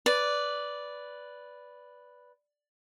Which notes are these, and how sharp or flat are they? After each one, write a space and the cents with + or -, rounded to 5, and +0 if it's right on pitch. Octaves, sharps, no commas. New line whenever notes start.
B4 +0 D5 -10